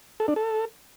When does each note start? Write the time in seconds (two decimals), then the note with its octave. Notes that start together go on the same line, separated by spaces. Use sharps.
0.20 A4
0.28 D4
0.36 A4